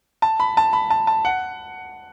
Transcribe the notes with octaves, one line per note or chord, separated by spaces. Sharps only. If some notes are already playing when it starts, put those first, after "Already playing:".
A5
B5
A5
B5
A5
A5
F#5